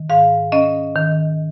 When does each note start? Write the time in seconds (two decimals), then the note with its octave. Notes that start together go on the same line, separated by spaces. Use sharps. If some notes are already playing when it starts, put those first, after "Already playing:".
Already playing: D#3
0.10 G#2 F5
0.52 C#4 D#5
0.96 D#3